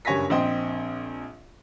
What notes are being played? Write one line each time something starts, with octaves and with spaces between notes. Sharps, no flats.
F#1 G2 C#5 G#5 A#6 B6
A#1 C4 D#5 G5 C6